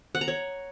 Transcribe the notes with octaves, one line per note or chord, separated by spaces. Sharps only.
F#5
A#5
C#5